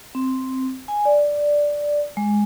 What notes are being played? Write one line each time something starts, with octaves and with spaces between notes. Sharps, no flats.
C4
G#5
D5
G#3